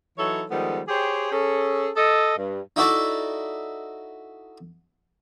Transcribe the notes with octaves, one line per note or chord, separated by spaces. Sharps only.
E3 F#3 D#4 A4 C#5
D#3 F3 G3 G#3 B3 A4
G4 G#4 C5 C#5 G5
C#4 G#4 A4
A4 D#5
G2
D#4 E4 F#4 A4 D5